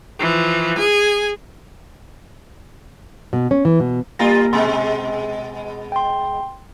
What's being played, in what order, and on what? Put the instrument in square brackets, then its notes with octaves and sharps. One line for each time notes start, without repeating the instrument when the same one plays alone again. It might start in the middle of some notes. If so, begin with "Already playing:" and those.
[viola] E3 F3
G#4 G#5
[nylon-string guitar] B2
C#4
E3
B2
[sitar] G3 F4 [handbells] A#3 A#5 A#6
[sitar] B2 G#3 [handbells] C6
[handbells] G5 C6